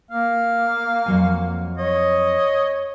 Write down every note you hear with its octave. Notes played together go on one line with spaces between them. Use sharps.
A#3 F5
F2 F#3 G#5
C#5 D#5